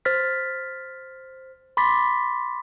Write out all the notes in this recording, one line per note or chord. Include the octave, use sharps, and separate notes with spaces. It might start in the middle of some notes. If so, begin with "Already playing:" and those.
C5 F6 A6 B6
B5 C6 D6 A6 B6